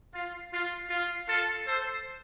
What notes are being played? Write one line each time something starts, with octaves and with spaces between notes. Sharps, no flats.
F4
F4
F4
F4 A4
A4 C5